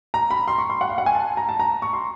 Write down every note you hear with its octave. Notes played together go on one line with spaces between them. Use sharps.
A#5
B5
C6
C#6
C6
F#5
F5
F#5
G#5
A5
A#5
A5
A#5
C#6
C6